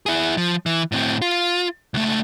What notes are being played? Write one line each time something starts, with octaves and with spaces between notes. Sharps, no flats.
E4 G#4
F3
E3
A2 C4
F4
C#2 A3